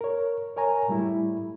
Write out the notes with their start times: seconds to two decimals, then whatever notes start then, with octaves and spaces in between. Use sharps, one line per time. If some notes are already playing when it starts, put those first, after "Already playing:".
0.01 A#4 C#5
0.56 A#4 C#5 G#5 A#5
0.88 A2 G3 A3 E4